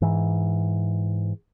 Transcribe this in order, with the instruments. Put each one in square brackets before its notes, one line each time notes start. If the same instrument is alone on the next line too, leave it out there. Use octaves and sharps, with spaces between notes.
[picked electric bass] G#2 E3